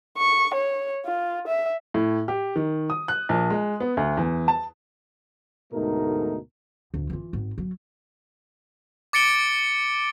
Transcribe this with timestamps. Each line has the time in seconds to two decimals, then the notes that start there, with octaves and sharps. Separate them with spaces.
0.18 C#6
0.54 C#5
1.06 F4
1.47 E5
1.94 A2
2.28 G4
2.56 D#3
2.90 D#6
3.08 F#6
3.29 A#1
3.50 G#3
3.80 B3
3.97 D2
4.17 E2
4.48 A5
5.73 D2 G#2 B2 A3 D#4 A#4
6.94 D2
7.10 E3 F4
7.33 G#1
7.58 F#3
9.13 D6 A6 C#7 D7 G7